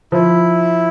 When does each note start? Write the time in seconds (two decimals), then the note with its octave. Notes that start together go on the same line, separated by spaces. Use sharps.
0.12 F3 E4